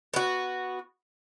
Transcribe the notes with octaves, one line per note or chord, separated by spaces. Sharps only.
B3 F#4